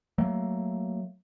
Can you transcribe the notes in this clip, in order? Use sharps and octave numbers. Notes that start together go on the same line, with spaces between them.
F#3 A3 A#3